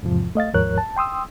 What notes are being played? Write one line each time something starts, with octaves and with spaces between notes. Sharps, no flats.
E2 G#2 C3 F3
A3 D#5 F5 A6
D#2 G#2 F3 A#4 C#5 F#6
A5
G5 C6 D#6 E6